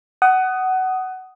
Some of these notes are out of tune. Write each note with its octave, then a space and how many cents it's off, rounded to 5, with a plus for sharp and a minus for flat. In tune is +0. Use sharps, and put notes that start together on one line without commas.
F#5 +20 D#6 +0